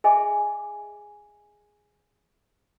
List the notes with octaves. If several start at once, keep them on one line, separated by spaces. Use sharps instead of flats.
G#4 D#5 E5 G#5 D6